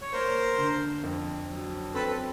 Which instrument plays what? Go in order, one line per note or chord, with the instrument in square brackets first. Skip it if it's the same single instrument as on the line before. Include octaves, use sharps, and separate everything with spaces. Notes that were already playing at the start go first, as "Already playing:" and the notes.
[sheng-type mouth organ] C#5
[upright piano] A#3 [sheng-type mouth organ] A#4 C5
[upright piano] D3
F2
F#3
[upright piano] C4 [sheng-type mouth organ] A4 B4